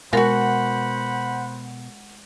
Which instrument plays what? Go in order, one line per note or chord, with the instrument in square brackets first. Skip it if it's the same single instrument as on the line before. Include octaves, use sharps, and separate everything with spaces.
[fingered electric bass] B2 [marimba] G#3 A#4 [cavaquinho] F4 F#4 [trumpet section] C5 F#5 B5